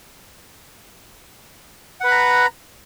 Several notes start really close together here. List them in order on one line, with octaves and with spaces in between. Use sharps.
F#5 B4 B5 A#5